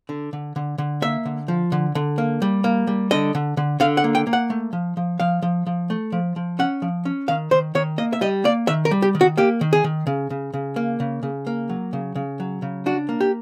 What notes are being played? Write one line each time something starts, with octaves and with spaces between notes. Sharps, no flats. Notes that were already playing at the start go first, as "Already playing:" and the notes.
D3
D3
D3
D3
A#3 E5
D3
F3
D3
D3
A#3
G3
A#3
G3
D3 D#5
D3
D3
D3 F5
F#5
A#3
G5
A#3
F#5
A3
F3
F3
F3 F5
F3
F3
A3
F3
F3
C#4 F#5
F3
C#4
D#3 F5
D#3 C5
D#3 C#5
A#3 D#5
E5
G3 D#5
A#3 D5
D#3 E5
A#4
G3
G4
D#3
F#4
A#3 G4
D#3
G#4
D#3
C#3
C#3
C#3
A#3
C#3
C#3
A#3
F#3
C#3
C#3
F#3
C#3
D4 F#4
A#3
G4